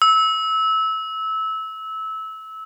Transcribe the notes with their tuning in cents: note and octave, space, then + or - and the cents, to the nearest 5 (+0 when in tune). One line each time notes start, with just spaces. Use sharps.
E6 -20